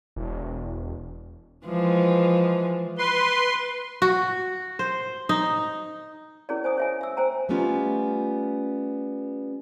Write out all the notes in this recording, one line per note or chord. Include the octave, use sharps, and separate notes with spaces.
E1
E3 F3 G#3
B4 C6
F#4
C5
D#4
C#4 E4 G#4 A#4 C#5 D5
C5 G#5 D#6
C#5 E5 G#5
E5 E6
C5 G5 G#5 A#5
G3 A3 B3 C#4 F4